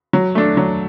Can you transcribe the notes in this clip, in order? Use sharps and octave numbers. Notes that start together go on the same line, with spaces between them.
F#3
A3 D4
F#3